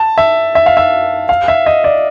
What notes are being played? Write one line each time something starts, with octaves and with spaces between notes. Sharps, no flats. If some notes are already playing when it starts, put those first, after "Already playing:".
Already playing: A5
E5
E5
F5
E5
F5
E5
D#5
D5